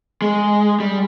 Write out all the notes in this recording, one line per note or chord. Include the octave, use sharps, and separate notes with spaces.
G#3
G3